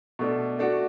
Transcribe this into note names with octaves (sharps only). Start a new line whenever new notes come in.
B2 A3 D4
A3 D4 F#4